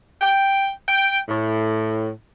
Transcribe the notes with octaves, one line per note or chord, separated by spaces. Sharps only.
G5
G5
A2